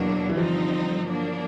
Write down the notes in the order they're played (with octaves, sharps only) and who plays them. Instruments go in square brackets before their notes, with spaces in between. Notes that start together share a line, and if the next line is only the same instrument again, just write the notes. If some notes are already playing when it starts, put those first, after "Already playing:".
Already playing: [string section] E2 B2 F#3 A#3 D4 [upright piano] E3
[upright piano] E3
[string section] G2 D3 G3 C4 D#4 [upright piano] F3
[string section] F#3 A#3 D4